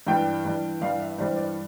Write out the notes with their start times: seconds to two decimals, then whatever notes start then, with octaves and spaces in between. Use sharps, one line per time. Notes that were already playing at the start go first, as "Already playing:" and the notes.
0.07 G2 E3 G3 G5
0.45 G2 E3 G3
0.81 G2 E3 G3 F5
1.00 E5
1.18 G2 E3 G3 C5
1.36 D5